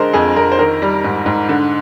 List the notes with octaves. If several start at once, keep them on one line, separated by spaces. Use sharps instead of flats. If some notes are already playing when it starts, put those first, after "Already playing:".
Already playing: D3 G#3 A#4 C5
F2 G#4
F2 A#4
C5
D#3 A#4
G3
G#2
G#2
D3